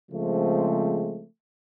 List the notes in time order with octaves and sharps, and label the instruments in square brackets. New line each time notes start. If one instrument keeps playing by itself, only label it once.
[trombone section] C#3 F3 G#3 A3 C4